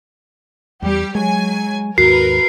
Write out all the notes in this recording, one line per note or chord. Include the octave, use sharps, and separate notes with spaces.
E2 G3 G4
F#3 G#3 G#5
D#2 G#2 F#4 A#4 B4 C7